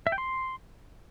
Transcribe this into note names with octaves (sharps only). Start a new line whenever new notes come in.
E5
G5
C6